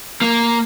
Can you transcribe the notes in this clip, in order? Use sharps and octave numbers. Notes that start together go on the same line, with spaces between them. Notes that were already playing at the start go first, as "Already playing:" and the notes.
A#3